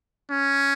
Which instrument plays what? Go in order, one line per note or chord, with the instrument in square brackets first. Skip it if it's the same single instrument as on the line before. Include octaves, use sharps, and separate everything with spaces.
[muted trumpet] C#4